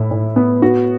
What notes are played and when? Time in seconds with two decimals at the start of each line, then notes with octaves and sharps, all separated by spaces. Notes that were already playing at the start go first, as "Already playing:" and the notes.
Already playing: A2 E4
0.11 A2
0.36 B3
0.62 F#4